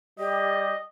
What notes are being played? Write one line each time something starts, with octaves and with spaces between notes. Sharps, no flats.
G3 G4 D#5